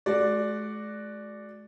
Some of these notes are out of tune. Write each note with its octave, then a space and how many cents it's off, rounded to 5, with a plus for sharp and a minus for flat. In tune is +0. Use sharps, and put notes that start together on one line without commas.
G#3 +45 F#4 +0 D5 +0